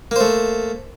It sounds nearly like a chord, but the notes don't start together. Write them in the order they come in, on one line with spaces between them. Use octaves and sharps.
A#3 C5 A3